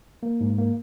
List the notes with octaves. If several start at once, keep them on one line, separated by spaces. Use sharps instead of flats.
A#3
G#2
A#3